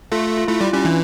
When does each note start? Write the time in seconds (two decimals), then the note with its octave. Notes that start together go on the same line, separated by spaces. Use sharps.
0.12 A3 F4
0.38 F4
0.48 A3 E4
0.60 G3 F4
0.73 G3 C#4
0.85 E3 D4